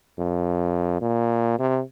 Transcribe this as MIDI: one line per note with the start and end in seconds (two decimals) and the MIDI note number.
0.19 0.97 41
1.01 1.58 46
1.59 1.81 48